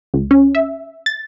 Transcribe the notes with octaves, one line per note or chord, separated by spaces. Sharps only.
C#2
C#4
E5
A6